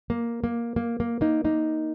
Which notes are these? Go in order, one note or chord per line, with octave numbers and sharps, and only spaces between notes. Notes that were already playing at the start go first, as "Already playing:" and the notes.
A#3
A#3
A#3
A#3
A#3 D#4
A#3 D#4